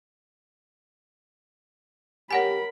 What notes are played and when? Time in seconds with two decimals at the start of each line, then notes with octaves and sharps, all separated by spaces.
2.31 G4 A#4 C#5 F#5 G#5 B5